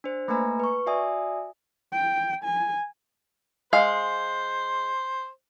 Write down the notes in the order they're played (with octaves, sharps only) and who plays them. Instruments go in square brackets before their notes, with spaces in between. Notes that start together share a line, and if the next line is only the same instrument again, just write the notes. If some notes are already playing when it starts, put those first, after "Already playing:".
[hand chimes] D4 C5
A3 A#3 B4 G#5 A#5
B4 C#6
F#4 D5 E5 G#5 D#6
[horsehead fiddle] G5
G#5
[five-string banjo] G#3 F5 [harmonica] C5